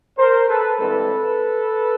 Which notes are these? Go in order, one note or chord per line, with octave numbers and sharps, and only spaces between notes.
A#4 C5
A4 B4
G2 E3 G#3 C4 A4 B4